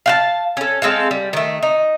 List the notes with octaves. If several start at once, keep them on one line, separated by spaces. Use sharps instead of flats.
F5 F#5 A5
C#4 A4
G#3 C4 A4 F5
G3
D#3 A3
D#4